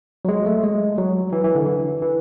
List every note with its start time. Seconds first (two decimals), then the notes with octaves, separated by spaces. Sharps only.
0.25 F#3
0.28 G#3
0.46 A3
0.64 G#3
0.98 F#3
1.32 E3
1.44 E3
1.55 D3
1.66 E3
2.02 E3